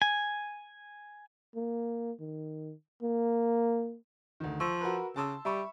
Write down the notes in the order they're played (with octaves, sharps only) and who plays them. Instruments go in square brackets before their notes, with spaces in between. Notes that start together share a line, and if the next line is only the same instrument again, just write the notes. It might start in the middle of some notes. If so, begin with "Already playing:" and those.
[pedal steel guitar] G#5
[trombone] A#3
D#3
A#3
[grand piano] D2 D#3
[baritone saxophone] F3 [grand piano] C#6 E6
[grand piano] F#4 A#4 B4
[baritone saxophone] C#3 [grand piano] A5 C6 E6
[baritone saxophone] G3 [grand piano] E5 B5 C#6